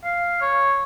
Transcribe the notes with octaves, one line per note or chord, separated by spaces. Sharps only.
F5
C#5